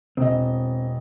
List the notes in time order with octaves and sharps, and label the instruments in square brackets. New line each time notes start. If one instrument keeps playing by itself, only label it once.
[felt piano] E1 D#5 [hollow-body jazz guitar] C4